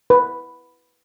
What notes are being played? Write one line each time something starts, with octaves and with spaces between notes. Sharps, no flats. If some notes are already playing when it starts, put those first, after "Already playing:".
B4